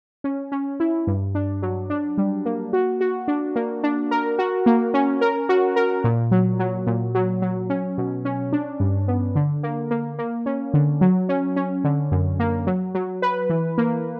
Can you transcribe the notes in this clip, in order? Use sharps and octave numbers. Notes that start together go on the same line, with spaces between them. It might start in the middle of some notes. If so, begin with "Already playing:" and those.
C#4
C#4
E4
G2
D4
F#3
D4
G3
A#3
F#4
F#4
D4
A#3
D4
A#4
F#4
A#3
C#4
A#4
F#4
A#4
A#2
F#3
F#3
A#2
F#3
F#3
C#4
B2
C#4
D4
G2
B3
D3
A#3
A#3
A#3
C#4
D3
F#3
C#4
C#4
D3
F#2
A#3
F#3
F#3
B4
E3
A#3